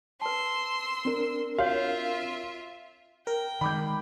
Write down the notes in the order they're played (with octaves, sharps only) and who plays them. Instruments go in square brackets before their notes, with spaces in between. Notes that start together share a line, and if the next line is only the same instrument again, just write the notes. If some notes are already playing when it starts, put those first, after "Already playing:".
[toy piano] B4 A5 [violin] C6 E6
[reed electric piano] C4 D4 A#4
[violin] F4 E5 [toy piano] F#4 C#5 [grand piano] F5
[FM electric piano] A#4 [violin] G5
[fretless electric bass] D#3 G#3 [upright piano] B5 D6 G6